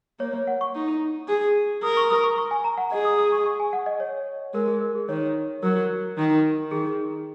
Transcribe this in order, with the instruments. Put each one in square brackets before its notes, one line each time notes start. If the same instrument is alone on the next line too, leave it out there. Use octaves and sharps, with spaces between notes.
[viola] A#3 [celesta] C#5
[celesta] C#5
F#5
C#6
[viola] D#4
G#4
[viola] A#4 [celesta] D#6
[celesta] C#6
D#6
C#6
C#6
G#5
A#5
F#5
[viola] G#4 [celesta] D#5
[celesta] D#6
D#6
C#6
C#6
G#5
F#5
D#5
C#5
[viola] G#3 [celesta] A#4
[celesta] G#4
A#4
G#4
[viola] D#3 [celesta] C#5
[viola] F#3 [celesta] A#4
[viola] D#3
[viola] D#3 [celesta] G#4